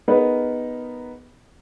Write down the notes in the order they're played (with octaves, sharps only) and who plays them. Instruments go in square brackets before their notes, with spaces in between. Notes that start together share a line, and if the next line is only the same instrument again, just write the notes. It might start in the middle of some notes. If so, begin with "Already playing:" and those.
[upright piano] B3 D#4 G#4 A#4 B4